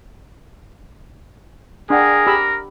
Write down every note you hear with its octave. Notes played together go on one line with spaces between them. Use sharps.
D4 G#4 A#4 F#5 G5
G4 B5 E6